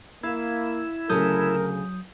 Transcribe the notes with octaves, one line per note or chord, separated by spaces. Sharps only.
A#3 E4 F5
D2 C#3 F#3 A4 A#4 D#6 G6